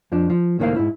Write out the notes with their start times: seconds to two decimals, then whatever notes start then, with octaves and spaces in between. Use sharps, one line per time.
0.12 F2 F3 D4
0.30 F3
0.59 C#2 A2 D#3 A#3 C5 F5
0.76 G#2 E4